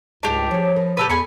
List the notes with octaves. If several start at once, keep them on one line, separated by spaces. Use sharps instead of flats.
C#2 G#2 G3 D4 G4 G#4
F3 G#4 C#5
D#4 A#4 B4
A#2 C#3 B3 G4 A4 B4
E2 A3 G#4 G#5 B5 C#6